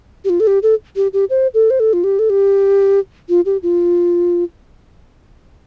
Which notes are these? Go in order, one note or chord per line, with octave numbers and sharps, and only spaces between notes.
G4
F4
A4
G4
A4
G4
G4
C5
A4
C5
A4
F4
G4
A4
G4
F4
G4
F4